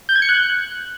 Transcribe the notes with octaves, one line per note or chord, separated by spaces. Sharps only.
G6
G#6
C#7
F#6